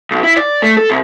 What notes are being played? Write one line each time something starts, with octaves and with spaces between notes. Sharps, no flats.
B1
E4
D5
A3
A4
C2